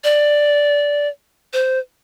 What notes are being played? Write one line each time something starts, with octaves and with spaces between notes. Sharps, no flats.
D5
C5